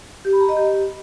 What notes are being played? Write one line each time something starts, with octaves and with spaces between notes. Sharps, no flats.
G4
B5
A#5
D#5
G4